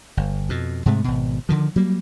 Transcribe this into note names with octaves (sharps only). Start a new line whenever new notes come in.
G1
F2 B2
G#2 C3 G#3 A3
G#1 B2
D3 D#3 F3
F#3 G3 A#3